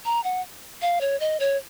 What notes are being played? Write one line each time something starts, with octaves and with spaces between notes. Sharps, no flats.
A#5
F#5
F5
C#5
D#5
C#5